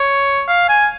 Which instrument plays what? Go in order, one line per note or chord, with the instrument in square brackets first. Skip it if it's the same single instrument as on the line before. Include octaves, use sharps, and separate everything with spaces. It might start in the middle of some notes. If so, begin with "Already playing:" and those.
Already playing: [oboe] C#5
F5
G#5